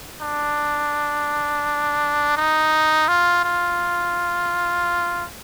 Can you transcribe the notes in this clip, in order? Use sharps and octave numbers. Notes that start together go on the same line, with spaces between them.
D4
D#4
F4
F4